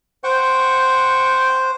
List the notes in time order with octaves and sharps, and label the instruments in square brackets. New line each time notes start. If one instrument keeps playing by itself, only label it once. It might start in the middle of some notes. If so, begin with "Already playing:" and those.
[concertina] C5 [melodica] F#5 G5 C#6